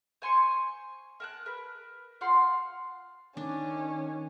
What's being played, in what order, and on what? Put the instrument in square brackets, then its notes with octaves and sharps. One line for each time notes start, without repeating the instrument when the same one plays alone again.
[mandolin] C5 G#5 C6 C#6
A#4 A5 F#6
A#4 B4
F4 C5 F#5 C6
[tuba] D#3 [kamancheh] C#4 [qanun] D4